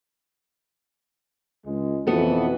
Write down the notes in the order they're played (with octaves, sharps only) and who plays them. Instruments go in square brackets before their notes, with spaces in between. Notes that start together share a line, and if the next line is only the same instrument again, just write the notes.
[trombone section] C#2 G#3
[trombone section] F2 B2 E3 [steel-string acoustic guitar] B3 F#4 A4